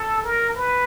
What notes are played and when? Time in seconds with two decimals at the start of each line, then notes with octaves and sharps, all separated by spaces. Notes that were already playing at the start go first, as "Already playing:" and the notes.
Already playing: A4
0.23 A#4
0.55 B4